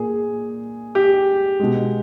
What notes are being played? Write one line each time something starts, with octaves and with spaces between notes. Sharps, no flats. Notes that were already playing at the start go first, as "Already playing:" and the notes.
Already playing: A#2 A#3 G#4
G4
B2 G#3